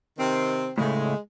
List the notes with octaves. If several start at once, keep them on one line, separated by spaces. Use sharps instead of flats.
C3 D#3 C4
A2 C#3 G#3 A3